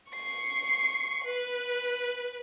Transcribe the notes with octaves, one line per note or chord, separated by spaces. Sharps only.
C#6 C7
B4